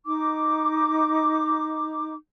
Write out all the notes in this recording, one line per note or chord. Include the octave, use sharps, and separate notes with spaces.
D#4 D6